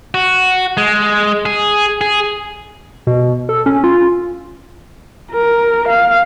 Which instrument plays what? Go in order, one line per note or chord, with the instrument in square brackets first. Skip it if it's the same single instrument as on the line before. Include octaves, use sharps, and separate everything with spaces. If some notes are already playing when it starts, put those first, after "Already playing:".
[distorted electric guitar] F#4
G#3
G#4
G#4
[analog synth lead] B2
A4
C#4
F4
[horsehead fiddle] A#4
F5